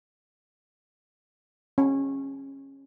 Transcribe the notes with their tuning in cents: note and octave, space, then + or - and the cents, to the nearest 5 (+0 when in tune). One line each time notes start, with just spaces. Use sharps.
C#4 -20